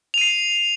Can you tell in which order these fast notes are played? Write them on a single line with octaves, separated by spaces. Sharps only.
F7 D#7 C7